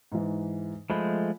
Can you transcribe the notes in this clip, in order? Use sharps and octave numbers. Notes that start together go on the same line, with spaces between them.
G#2 E3
F3 G#3 A3 B5